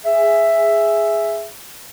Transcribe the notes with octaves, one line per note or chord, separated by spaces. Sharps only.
G#4 E5